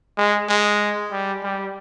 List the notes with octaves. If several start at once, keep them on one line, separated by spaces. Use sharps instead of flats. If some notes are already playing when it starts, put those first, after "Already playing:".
G#3
G#3
G3
G3